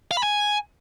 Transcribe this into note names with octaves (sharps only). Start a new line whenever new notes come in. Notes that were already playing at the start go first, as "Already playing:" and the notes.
F5
B5
G#5